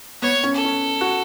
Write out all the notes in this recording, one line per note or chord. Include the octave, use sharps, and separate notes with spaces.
B3 C#5
C#4
A4
C#4
F#4